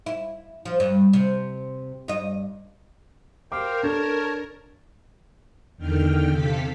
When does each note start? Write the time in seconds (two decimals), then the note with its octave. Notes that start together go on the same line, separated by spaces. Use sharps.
0.06 E4
0.65 F3
0.80 G2
1.13 C3
2.08 G2 D#5
3.52 A#4 C5 F5 G5 D6
3.83 D4 A4 C#5 A5
5.77 E2 D3 D#3 G5 F6
6.30 C3 A4 F5 B6